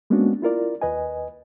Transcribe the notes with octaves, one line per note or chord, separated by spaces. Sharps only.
G#3 A#3 B3 C#4 D4 F#4
E4 F4 A#4 D5
D#2 B4 D#5 G#5